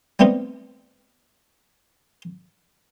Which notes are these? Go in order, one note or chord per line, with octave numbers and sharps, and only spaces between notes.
G3 A3 B3 C4 D#4